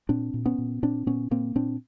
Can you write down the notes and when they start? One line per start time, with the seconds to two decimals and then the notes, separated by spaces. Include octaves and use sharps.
0.09 A#2 C4 D4
0.34 A#2
0.45 B3 C#4
0.58 A#2
0.83 A#2 C4 D4
1.06 A#2 B3 C#4
1.31 A#2 A#3 C4
1.55 A#2 C4 D4